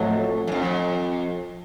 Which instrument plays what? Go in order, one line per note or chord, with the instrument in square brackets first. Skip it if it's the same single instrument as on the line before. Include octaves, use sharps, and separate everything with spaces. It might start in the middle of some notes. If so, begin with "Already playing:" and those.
Already playing: [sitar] F2 [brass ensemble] A2 F#3 A3
[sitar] F#2
F2